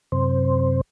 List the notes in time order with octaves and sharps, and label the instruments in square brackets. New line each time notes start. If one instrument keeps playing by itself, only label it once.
[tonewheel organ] F#2 C3 C5